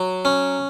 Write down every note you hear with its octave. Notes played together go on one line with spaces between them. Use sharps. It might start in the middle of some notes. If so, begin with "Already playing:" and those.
Already playing: F#3
C#4